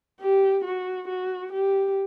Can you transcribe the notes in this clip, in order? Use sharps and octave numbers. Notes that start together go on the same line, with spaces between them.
G4
F#4
F#4
G4